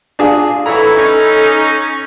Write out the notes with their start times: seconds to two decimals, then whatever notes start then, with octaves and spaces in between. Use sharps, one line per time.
0.19 D4 F4 G#4
0.66 E3 F#3 E4 A4 A#5
0.96 C#4 D#4